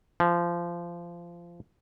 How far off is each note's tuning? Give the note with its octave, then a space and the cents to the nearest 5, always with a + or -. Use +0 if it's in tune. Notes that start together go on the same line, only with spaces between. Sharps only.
F3 -20